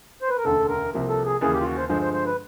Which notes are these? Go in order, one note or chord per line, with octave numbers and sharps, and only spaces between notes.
C5
B4
A#4
E1 D2 C#3 A4
A#4
C2 C3 F3 A#3
A4
G#4
D#2 C#3 E3 G#4
G4
F4
F#4
C5
G2 D3 F3 G#3 C5
C5
C5
B4